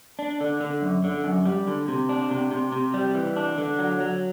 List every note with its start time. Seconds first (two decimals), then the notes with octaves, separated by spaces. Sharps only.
0.19 D4
0.41 D3
0.61 D3
0.82 F#2
1.04 D3
1.24 F#2
1.45 G3
1.67 D3
1.88 C3
2.09 D4
2.31 C3
2.51 C3
2.72 C3
2.94 G3
3.14 E3
3.36 D4
3.58 D3
3.79 F#3
4.00 F#3